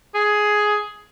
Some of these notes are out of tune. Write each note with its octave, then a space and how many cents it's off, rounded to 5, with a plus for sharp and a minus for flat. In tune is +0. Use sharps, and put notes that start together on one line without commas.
G#4 +10